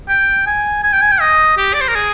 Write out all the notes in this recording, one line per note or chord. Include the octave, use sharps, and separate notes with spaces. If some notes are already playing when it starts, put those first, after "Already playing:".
G5
G#5
G#5
G5
G#5
G5
D#5
G4
D5
C5
A#4
G#4